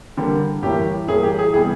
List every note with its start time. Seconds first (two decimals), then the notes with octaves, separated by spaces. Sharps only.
0.17 D3 G3 A#3
0.63 A2 E3 G3 A#3 G4
1.08 A2 E3 G3 A#3 G#4
1.23 G4
1.39 G#4
1.53 C3 E3 G3 B3 G#4